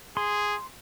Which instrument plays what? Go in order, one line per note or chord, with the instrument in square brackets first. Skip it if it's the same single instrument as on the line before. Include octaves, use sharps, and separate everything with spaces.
[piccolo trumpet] G#4 [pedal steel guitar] C6